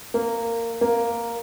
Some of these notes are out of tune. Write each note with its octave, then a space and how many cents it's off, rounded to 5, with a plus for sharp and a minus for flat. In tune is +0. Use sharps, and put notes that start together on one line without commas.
A#3 -15
A#3 +0